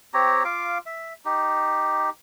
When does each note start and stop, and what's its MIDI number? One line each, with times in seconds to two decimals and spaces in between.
0.14 0.43 60
0.14 0.43 67
0.14 0.43 73
0.14 0.43 82
0.45 0.78 65
0.45 0.78 77
0.45 0.78 86
0.86 1.13 76
1.25 2.10 63
1.25 2.10 67